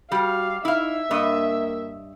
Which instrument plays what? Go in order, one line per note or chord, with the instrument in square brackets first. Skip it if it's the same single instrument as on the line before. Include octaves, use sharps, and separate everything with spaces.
[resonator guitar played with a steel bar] G3 [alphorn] F#4 [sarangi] F5
[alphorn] D#4 [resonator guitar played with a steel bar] E4 F5 [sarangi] E5
[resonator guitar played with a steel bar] G2 D#5 [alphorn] A#3